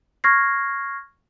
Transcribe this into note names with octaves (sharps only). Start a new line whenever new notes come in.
C#6 F6 G#6 A#6 C7